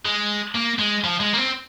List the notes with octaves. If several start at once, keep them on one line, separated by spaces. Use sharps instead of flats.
G#3
A#3
G#3
F3
G#3
A#3
C4